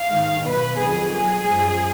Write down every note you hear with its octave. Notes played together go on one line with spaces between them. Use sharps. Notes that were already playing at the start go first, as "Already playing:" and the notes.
Already playing: F5
G#2 D#3 G#3
B2 F#3 B4
F2 D#3 F#3 G#4
B2 F#3 G#4
F#2 F3 G#3